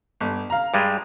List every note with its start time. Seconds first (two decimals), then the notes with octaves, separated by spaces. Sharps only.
0.21 G1
0.50 F5 A#5
0.74 G2 G3 G#3